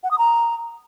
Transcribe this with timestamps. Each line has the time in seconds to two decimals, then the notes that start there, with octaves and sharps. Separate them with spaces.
0.04 F#5
0.11 D#6
0.18 A#5